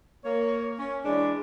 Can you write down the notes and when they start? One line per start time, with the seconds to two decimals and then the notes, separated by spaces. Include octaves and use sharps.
0.24 A#3 C#5
0.79 C#4
1.04 E3 G#3 D4